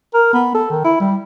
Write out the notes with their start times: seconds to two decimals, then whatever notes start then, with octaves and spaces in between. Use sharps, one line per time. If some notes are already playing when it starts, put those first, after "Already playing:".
0.14 A#4
0.33 B3
0.55 A4
0.71 D#3
0.85 E4
1.00 G3